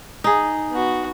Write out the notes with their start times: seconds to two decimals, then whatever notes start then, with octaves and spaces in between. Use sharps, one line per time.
0.24 D#4 G#4
0.71 B3 F#4